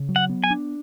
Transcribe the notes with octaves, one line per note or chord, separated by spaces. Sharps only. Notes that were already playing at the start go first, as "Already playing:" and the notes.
Already playing: C#3
F#3
F#5
B3
G#5
D4